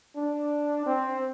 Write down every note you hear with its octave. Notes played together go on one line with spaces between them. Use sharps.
D4
C4